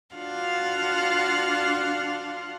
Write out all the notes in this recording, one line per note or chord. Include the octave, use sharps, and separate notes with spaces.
D4 F4 F#4 F5 F#5